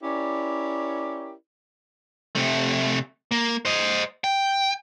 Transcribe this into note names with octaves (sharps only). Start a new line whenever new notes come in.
C#4 E4 G4 A#4 C#5 D5
C3 A3
A#3
C5 D#5
G5